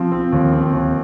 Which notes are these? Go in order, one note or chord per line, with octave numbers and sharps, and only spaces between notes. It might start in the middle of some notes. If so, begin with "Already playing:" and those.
Already playing: F3 C4
C4
D#2
C4
D#2